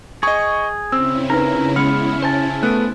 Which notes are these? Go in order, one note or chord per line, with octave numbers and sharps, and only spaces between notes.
G#4 D#5 C#6
C#3 C4 C#4 E4 E6
D#4 A#4 B4
G#3 B3 F6 C#7
C5 G#5 A5
A3 B3 F#6 D7